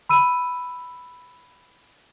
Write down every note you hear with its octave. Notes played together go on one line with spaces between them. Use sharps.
B5 E6 D#7